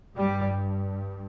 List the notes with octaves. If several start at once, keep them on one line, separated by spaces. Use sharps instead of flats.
G2 G3